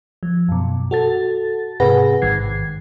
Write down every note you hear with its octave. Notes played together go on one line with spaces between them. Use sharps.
F3
F#2 B2
F#4 A4 A6
G#2 C3 G#4 B4 F#5 A#6
A1 G#2 D#3 G#6 C7